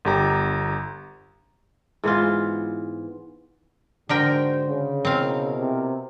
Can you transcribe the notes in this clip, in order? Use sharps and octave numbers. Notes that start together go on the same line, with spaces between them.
G1 G4 A#5
G#2 E3 B3 F4
G#2 D3 F#4 A#4 C5 G5
C#3
B2 C4 E4 A#4 F5
C3